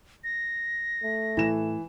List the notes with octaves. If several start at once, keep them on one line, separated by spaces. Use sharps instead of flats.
A#6
A3
A2 E3 E7